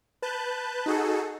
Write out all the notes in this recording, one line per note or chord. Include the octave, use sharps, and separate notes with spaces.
B4 A5 F#6 G6
D#4 F#4 G#4 A4